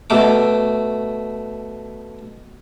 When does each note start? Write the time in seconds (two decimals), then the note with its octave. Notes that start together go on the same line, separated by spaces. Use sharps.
0.10 B2 A3 D6